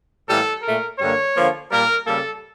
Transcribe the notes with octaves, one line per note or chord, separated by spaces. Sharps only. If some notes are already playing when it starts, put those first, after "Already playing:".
A2 E3 G3 A#3 A4
A#2 A3 A#4
G2 D3 G3 A#3 C#5
D3 F3 A#3
A#2 G3 A#3 A#4
C#3 G3 A#3 A4